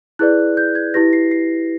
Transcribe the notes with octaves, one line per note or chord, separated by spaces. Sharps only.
E4 G#4 B4 D5 F#6
G6
G#6
E4 G4 B4 A#6
C7
C7